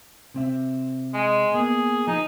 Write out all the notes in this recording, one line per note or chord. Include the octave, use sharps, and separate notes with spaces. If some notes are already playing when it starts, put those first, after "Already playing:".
C3 C4 E5
G#3
A#3 B3 G#4
F3 D#4